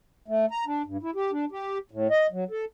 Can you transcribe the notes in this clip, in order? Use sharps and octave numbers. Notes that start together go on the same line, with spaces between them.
A3
A#5
D4
G2
E4
G4
D4
G4
A2
D#5
F#3
A4